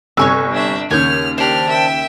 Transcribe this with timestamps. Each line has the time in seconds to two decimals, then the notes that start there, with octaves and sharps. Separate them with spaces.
0.17 G1 C3 C#5 G#5 C#6 E6
0.52 D4 E5
0.91 D#2 C#3 C#5 F6 G6
1.38 D4 G4 C5 F6
1.70 E5 G5